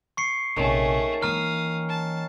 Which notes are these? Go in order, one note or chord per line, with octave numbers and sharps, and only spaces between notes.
C#6 C7 C#7
A#1 C3 D#3 A3 C#4 G#4
E3 A#3 F5 A#5 D#6 F6
A5